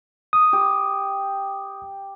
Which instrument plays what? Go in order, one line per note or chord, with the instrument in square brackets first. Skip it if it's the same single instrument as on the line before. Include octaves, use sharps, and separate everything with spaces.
[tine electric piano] D#6
[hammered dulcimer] G4